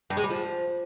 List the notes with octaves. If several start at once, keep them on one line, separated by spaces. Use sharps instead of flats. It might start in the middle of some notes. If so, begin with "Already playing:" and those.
G2
G#3
G3
F3